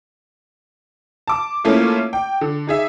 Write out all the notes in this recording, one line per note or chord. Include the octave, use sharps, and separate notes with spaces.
A5 D6
F3 A3 A#3 C#4 E4 F4
G5
D3
D#4 G#4 E5